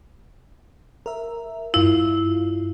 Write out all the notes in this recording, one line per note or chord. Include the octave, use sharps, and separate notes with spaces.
A#4 E5
G2 E4 F4